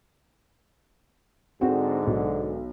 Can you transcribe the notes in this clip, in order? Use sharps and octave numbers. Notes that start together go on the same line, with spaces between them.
G#2 D3 C4 F#4
B1